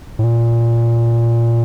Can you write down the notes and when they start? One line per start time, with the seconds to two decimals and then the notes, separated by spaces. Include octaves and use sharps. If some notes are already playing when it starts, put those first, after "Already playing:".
0.19 A2
0.24 A#2